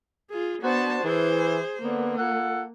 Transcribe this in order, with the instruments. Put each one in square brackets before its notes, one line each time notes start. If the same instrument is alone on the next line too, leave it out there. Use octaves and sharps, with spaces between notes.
[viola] F4 G#4
[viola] B3 A5 [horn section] D4 F#4 C5
[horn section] E3 [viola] G#4 C5
[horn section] D3 B3 [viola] A#3
[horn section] F4 A4 F#5